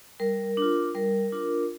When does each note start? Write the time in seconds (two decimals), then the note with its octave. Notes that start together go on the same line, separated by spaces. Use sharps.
0.20 G3 A#4
0.57 D4 F4
0.95 G3 A#4
1.32 D4 F4